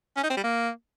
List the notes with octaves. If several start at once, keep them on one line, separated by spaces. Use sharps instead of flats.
C#4
D#4
C4
G3
A#3